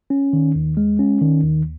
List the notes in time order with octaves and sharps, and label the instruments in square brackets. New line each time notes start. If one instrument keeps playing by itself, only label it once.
[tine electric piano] C#4
D#3
D#2
G#3
C#4
D#3
D#2